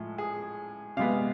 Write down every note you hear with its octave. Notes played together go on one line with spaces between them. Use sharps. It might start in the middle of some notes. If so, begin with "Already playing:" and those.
Already playing: A2 F3 G#3
G#4
C3 G#3 B3 F5